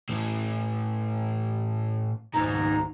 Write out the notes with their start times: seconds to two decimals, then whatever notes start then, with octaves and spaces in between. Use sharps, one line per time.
0.09 A2 E3
2.34 C#2 G#2 D#3 A#5